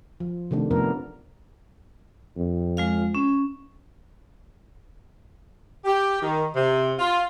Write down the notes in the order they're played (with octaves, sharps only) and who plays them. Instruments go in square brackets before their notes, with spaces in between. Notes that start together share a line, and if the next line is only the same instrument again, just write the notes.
[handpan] F3
C3 D#3 A3 D4
C3 F3 A3 B3 D4 A#4
[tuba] F2
[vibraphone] G#3 F4 F5
C#4
[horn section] G4
D#3
C3
F4